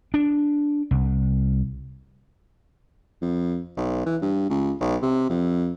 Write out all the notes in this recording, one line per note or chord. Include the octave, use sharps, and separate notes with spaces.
D4
C2
F2
B1
E3
G2
C#2
B1
C3
F2